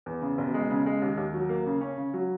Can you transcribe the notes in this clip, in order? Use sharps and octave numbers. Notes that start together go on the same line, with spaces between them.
E2
C#3
E1
G#3
C#3
G#3
D#2
D#2
F#3
A#3
C#3
C#4
C#3
F#3